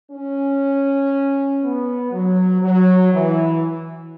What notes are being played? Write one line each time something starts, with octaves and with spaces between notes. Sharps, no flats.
C#4
B3
F#3
F#3
E3